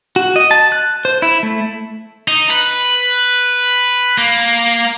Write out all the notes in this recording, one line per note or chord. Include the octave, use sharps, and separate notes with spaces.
F#4
D#5
A5
F#6
C5
E4
A3
D#4
B4
A#3